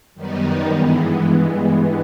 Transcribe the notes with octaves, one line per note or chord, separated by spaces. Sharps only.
F#2 D#3 G3 B3 D#4
G2 E3 G#3 B3